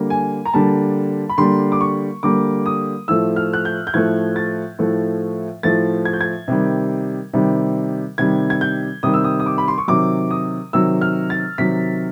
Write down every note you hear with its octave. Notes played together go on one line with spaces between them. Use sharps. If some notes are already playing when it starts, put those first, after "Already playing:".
Already playing: D3 G3 A#3
G#5
A#5
D3 G3 A#3 A5
B5
D3 G3 A#3 C6
D6
C#6
D3 G3 A#3 D6
D#6
A2 F3 A3 E6
F6
F#6
G6
G6
A2 F3 A3 G#6
A6
A2 F3 A3
A2 F3 A3 A6
G#6
G6
G#6
C3 D#3 G3
C3 D#3 G3
C3 D#3 G3 G#6
G#6
G6
C3 D#3 G3 D#6
E6
D#6
D#6
D6
B5
C6
C#6
C3 D#3 F#3 D6
D#6
C3 D#3 F#3 E6
F6
A6
C3 D#3 F#3 B6